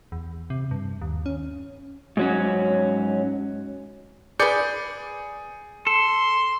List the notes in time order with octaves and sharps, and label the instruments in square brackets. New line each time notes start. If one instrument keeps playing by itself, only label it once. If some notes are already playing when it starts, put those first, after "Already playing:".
[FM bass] E2
C3
G2
D#2
C#4
[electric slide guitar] G#2 F#3 C#4
[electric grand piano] G#4 G6 C#7 [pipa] B4 D5
[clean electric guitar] A4 [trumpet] C6